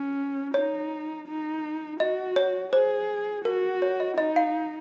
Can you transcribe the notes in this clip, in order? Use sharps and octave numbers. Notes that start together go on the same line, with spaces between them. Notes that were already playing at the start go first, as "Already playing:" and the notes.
Already playing: C#4
D#4 C#5
D#4
F#4 D#5
C#5
G#4 C5
F#4 A#4
C#5
D#5
D#4 D#5
F5